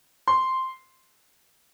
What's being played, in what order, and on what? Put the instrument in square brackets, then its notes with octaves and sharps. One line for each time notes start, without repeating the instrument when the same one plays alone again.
[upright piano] C6